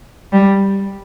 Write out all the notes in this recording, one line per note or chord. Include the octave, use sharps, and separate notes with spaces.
G3